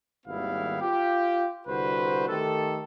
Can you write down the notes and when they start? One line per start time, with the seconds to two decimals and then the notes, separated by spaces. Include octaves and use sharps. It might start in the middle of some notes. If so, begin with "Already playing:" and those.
0.26 G#1 D#2 G3 B3 E4 F5
0.81 F4 G4
1.68 C2 D3 F#4 B4 C5
2.28 D#3 A3 G4 A4